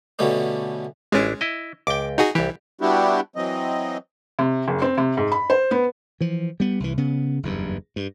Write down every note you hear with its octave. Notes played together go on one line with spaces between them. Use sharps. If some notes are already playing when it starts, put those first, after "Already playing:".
B2 D3 G3 A3 C#4
A1 G#3 C#4 D4 E4
E4 D#5
C#2 G5 D6
D#4 F#4 G#4
C2 E3 G4
G3 B3 D4 E4 F#4 G4
E3 F#3 C4 D#5
C3
F#1
C4
C3
G#2
B5
C5
B3
E3 F3
G3 B3
C2 E3
C#3 B3
F#1 E2 G2
G2